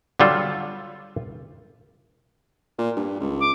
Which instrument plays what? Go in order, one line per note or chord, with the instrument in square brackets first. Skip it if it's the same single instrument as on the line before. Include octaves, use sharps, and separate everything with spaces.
[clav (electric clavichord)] D3 F#3 G3 F4 A4
[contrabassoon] A#2
G2
C#2
[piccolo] D6